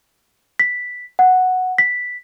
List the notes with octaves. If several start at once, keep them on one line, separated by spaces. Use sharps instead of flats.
B6
F#5
B6